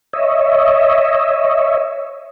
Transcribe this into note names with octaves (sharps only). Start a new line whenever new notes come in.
C#5 D#5 E5